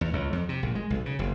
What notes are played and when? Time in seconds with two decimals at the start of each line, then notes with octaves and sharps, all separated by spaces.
0.01 E2
0.13 C#2
0.33 F2
0.49 C3
0.63 A#1
0.75 G#3
0.90 B1
1.06 C#3
1.19 F#1